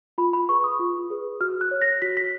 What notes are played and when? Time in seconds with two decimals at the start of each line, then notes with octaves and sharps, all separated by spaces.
0.18 F4 B5
0.33 B5
0.49 G#4 B4 C#6
0.64 D#6
0.79 F4
1.10 G#4 B4
1.41 F#4 F6
1.61 F#6
1.71 C#5
1.82 A#6
2.02 F#4 B6
2.17 B6